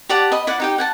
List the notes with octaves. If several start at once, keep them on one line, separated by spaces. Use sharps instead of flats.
G4 D5 F#5 A5
D#5 B5
E4 D5 F#5
D#4 G4 G5
F#5 G#5 A5